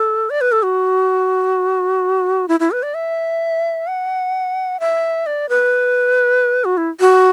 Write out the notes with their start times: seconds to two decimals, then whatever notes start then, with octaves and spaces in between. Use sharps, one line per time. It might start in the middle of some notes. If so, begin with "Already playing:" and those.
Already playing: A4
0.30 D5
0.41 B4
0.52 A4
0.63 F#4
2.48 E4
2.60 E4
2.71 B4
2.83 D5
2.94 E5
3.87 F#5
4.80 E5
5.26 D5
5.49 B4
6.65 F#4
6.77 E4
7.00 F#4